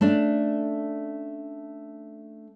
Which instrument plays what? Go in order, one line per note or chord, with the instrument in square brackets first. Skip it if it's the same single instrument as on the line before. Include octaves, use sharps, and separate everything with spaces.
[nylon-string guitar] A3 C#4 D4